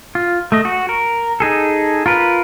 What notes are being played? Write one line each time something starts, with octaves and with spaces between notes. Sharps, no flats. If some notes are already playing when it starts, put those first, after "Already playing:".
F4
A3 D#5
F#4
A#4
D#4 G#4 A4
F4 A#4 B4